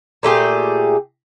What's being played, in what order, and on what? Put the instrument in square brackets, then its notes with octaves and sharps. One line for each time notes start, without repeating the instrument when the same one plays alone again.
[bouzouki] A#2 A3 G4 G#4